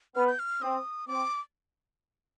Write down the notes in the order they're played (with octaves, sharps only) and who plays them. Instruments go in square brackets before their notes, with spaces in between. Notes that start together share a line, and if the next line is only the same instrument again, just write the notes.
[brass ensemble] B3 [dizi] F6
[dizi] G6
F6
[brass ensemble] C4 [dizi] D#6
[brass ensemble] C4 [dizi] D6